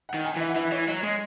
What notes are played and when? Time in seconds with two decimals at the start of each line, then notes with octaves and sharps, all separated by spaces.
0.09 F#5
0.14 D#3
0.25 G#5
0.36 E3 E5
0.49 F#5
0.56 E3 E5
0.72 E3 C#5
0.88 F#3 C#5
1.03 G#3 D#5